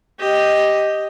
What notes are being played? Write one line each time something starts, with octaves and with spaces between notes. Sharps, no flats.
G4 D#5